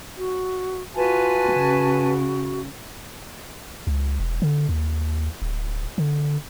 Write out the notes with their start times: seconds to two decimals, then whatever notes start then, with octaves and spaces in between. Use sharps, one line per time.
0.18 F#4
0.95 F4 F#4 B4 G#5 A5
1.53 C#3
3.87 C#2
4.20 E1
4.42 D3
4.69 D#2
5.42 D1
5.98 D3